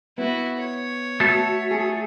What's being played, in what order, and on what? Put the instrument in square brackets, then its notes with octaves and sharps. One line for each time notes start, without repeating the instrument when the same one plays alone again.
[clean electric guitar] B3 [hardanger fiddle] E4 F#4
[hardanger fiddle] C#5
[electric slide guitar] A3 A4 [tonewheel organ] F#4
[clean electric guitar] G#4